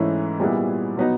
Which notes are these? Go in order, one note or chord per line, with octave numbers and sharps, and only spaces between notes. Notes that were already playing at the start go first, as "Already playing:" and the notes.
Already playing: G#2 E3 A3 C#4 E4
A#2 G3 B3 E4 G#4
B2 F#3 B3 D#4